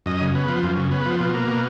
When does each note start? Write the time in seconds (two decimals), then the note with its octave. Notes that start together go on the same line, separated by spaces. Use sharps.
0.06 F#2 D#5
0.21 C#3
0.35 B3
0.48 F3
0.63 F#2
0.77 C#3
0.91 B3
1.06 F3
1.20 B2
1.34 A#3
1.48 B2